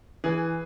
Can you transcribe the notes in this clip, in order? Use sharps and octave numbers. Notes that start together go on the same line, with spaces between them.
E3 G#4 B4